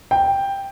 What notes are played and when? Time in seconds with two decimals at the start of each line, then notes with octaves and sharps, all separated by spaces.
0.11 G5